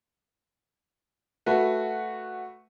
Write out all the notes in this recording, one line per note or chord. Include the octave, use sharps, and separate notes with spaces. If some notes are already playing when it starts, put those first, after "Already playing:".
A3 F#4 B4